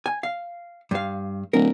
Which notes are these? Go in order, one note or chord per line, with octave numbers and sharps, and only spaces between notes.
G#5
F5
G2 F5
D1 A#4